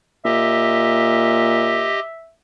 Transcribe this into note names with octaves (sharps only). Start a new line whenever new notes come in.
A#2 G4 D#5 E5